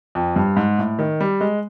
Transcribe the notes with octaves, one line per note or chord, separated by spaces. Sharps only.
F2
G2
G#2
A2
D#3
G3
G#3